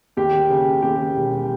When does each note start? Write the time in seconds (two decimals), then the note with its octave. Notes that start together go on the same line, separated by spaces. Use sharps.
0.17 D#2 G4
0.50 C#3
0.83 D#2 G4
1.16 E1